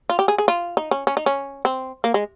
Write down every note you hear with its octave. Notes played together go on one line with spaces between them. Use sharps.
F4
G4
G#4
G#4
F4
D#4
C#4
C#4
D#4
C#4
C4
A#3
G#3